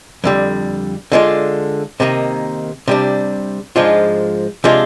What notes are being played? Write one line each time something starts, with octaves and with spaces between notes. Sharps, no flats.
F2 D3 G3
D3 G#3 D4 F4
C3 D#3 A#3 D#4
C3 G3 D4
G#2 F3 G#3 D4 F4
C3 F3 G#3 D4 F4